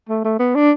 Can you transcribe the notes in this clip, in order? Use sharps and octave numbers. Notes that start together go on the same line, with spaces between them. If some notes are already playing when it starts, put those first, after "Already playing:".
A3
A3
B3
D4